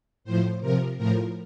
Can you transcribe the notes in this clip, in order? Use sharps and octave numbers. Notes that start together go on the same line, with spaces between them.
A2 F3 C5
C3 F3 A#4
A2 F3 A#4